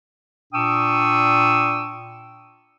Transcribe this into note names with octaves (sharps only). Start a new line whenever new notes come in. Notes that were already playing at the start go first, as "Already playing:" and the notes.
A#2 D4 G5 C#6 D#6 E6